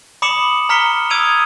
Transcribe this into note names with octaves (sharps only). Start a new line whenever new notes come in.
B5 D6 D#6 C#7 E7 F#7
A#5 F6 B6 C#7 G7
D#6 E6 G#6 D7 D#7 F7